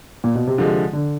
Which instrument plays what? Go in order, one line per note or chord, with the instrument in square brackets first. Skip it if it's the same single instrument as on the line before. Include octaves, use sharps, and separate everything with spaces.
[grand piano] A#2
B2
C3
[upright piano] D3 F3 G#3
[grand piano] D3